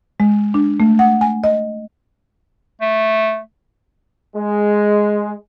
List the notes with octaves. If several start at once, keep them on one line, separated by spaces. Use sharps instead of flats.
G#3
D4
A3
F#5
G#5
D#5
A3
G#3